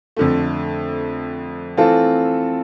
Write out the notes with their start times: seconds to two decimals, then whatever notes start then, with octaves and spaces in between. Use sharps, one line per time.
0.17 F2 D3 A3
1.77 E3 A3 C4 F4 A4